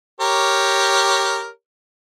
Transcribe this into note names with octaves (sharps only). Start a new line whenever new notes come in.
G4 A#4 C#5